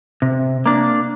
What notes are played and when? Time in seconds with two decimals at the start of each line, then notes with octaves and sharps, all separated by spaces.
0.22 C3
0.66 A#3 D4